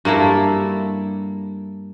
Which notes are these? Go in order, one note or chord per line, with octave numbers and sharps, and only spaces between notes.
G2 A#3 E4 A4